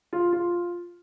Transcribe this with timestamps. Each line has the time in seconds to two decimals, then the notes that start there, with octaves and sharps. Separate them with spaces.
0.13 F4
0.33 F4